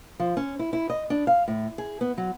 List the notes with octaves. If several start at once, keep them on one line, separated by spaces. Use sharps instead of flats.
F3
C#4
E4
E4
D#5
D4
F5
A2
G#4
B3
F#3